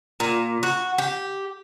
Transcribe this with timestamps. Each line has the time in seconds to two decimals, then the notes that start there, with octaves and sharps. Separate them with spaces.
0.20 A#2
0.63 F#4
0.98 G4